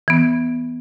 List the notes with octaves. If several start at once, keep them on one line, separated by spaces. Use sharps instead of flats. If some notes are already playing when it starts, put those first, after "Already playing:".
E3 B3